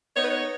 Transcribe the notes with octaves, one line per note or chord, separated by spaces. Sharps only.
B3 D#4 C#5
B4
C#5